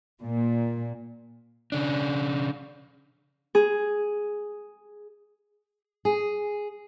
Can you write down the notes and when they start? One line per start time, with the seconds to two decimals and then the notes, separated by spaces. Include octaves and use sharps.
0.23 A#2
1.72 C#3 D4
3.55 G#4
6.05 G#4